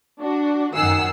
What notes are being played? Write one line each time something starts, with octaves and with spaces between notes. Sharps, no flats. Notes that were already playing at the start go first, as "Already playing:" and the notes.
D4 F#4
F#2 D#3 F#5 G#5 E6 C7